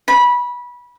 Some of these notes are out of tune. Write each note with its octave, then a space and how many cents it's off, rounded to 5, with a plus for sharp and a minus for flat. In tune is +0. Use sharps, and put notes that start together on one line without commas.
B5 -20